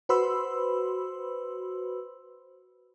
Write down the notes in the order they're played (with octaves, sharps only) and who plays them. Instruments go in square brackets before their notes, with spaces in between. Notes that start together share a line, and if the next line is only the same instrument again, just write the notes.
[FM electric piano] F#4 B4 C5 B5 C6 E6